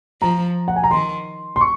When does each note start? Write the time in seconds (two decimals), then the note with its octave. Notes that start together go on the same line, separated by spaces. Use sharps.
0.21 F3 A#5
0.68 F#5
0.76 G#5
0.84 A#5
0.91 D#3 C6
1.56 C6
1.61 C#6